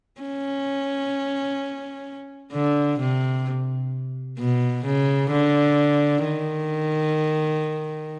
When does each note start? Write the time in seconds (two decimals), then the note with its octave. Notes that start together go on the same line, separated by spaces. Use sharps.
0.21 C#4
2.53 D3
3.00 C3
4.39 B2
4.86 C#3
5.31 D3
6.25 D#3